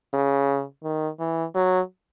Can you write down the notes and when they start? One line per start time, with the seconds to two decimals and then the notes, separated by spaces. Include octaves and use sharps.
0.14 C#3
0.84 D#3
1.20 E3
1.55 F#3